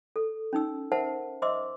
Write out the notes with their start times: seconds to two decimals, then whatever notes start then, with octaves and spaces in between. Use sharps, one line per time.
0.16 A4
0.53 C#4 D#4 E6
0.92 A#4 C5 E5 F#5 A5
1.42 C5 D#5 E5 C6 D6 E6